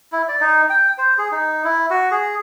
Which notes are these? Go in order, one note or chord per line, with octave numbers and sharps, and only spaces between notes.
E4
D5
D#4
G5
C5
G#4
D#4
E4
F#4
G#4